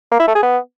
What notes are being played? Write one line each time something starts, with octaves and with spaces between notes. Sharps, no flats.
A#3
E4
A3
G#4
B3